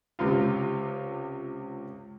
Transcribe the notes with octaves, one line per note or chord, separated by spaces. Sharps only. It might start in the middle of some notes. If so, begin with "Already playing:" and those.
C#2 C3 F4